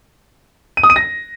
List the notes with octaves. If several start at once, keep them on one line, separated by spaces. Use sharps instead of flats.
D#7
D#6
D#7
A#6